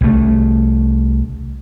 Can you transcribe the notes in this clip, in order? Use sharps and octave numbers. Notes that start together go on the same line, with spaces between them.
C2 A3